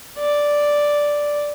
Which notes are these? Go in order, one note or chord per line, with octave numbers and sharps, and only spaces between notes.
D5